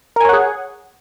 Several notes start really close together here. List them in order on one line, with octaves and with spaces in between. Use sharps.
A#4 G#5 C#5 F#5 G#4